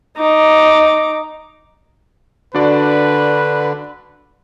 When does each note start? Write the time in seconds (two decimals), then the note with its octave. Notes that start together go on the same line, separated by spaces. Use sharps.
0.18 D#4 D6
2.55 D3 D4 F#4 B4 D5